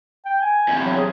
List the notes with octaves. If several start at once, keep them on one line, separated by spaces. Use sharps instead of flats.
G5
G#5
E2 C3
F#3
G#4